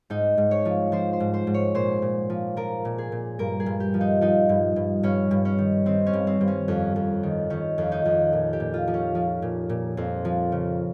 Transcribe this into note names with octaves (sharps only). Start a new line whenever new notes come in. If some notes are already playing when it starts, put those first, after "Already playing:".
G#2 D#4
G#2
C#5
F3
F3 C5
C5
G#2
C5
G#2
C#5
A#2 C5
A#2
F3
F3 A#4
A#2
G#4
A#2
G2 A#4
G#4
G2
G4
F3
D#4
F3 D#4
G2
G2
G2 C#4
G2
C#4
D#3
D#3 C4
C#4
G2
C4
G2
C#4
F2
F2
D#3
D#3 C#4
F2
D#4
F2
A#2
G4
A#2
F4
F3
C#4
F3
A#2
A#2
F2 C4
F3
C#3